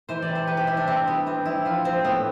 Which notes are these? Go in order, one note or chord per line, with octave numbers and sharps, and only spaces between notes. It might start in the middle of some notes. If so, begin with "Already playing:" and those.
E3 C5
D5
C3
C5
C3 B4
G4
C3 E4
D4
C3 C4
G3 B3
E3 C4
G3 E4
F3 F4
F3 C4
A2 B3